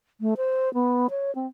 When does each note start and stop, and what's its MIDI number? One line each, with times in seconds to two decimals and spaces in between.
0.21 0.34 57
0.37 0.72 72
0.74 1.07 59
1.10 1.33 73
1.35 1.47 60